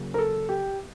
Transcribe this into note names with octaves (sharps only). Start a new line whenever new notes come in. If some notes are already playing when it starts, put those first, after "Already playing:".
Already playing: C#3 F#3 A#3
A#4
A4
G4